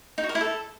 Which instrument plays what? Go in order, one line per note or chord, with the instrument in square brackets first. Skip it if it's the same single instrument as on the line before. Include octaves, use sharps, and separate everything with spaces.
[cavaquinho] D#4
F#4
A#4
E4
A4